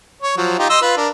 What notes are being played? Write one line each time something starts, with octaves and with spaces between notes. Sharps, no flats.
C#5
F3 F#3
D#4 F4 G4
D#5 C6 E6
F4 B4
D4 A#4